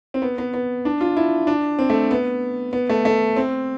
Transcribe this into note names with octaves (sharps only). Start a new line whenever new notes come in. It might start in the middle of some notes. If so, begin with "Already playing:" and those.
C4
B3
B3
B3
D4
F4
E4
D4
C4
A3
B3
B3
A3
A3
C4